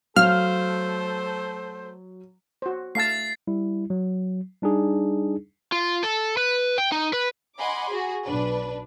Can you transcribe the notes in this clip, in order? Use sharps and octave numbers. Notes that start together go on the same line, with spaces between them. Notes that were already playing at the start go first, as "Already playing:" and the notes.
F#3 A3 A4 C5 F5 F6
F#4 C5
A3 F5 A5 A6 C7
G3 E4
F#3
G3 D4 D#4 G#4
F4
A4
B4
G5
D#4
B4
D#5 F#5 G#5 B5 C6 D6
F#4 G#4
B1 D4 B4